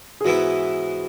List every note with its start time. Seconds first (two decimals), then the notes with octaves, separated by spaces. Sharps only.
0.21 G#4
0.25 G#2 E3 B3 E4 F#4